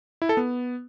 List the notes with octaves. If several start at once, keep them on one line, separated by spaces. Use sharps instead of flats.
E4
A4
B3